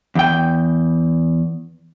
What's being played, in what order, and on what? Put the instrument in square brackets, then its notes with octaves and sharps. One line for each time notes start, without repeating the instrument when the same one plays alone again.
[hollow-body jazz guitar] E2 G5